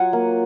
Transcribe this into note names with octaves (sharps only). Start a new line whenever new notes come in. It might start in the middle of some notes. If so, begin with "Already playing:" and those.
Already playing: F#3 F4 F#5 G#5
A#3